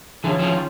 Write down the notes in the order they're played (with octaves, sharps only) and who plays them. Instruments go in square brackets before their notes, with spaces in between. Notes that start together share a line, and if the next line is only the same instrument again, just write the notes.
[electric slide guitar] D3 E3 [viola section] C#4 F4 G#4 C#5
[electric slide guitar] D#3 F3